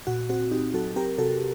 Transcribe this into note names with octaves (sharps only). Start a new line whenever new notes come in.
A#2 F#4
C4 F#4
C4 D#4 G4
F#3 F#4 A4
C4 G4 A#4
C3 F#4 A4